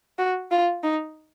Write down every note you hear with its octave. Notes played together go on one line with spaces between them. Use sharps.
F#4
F4
D#4